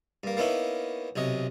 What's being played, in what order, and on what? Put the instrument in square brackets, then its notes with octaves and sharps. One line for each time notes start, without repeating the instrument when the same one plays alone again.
[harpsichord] G2 A#3
A#3 B3 C#4 D#4 E4
B1 C3 C#5 D#5